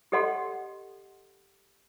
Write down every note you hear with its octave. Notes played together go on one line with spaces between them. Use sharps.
G4 A4 D#5 F#5 C6